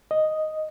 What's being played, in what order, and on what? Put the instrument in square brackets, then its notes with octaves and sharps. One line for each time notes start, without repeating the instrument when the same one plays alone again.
[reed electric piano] D#5